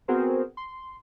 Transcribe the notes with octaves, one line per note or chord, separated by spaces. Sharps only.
B3 C4 F#4 G#4 A#4 C5
C6